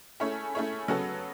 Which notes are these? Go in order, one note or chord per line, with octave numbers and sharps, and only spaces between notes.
A3 C#4 E4 G#4 C#5
A3 C#4 E4 G#4 C#5
C#3 F#3 B3 F#4 A4